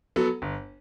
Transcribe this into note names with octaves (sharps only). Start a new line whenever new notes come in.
F#3 B3 F#4 A4
G1